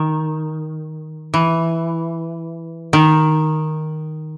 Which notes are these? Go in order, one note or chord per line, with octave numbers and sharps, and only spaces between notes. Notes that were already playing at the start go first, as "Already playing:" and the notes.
Already playing: D#3
E3
D#3